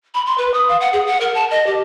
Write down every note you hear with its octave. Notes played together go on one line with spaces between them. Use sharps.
B5
C6
B4
D#6
F5
F#5
G#4
F#5
A#4
A5
D#5
G4